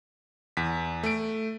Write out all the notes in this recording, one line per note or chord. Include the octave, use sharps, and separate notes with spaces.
E2 B6
A3 D7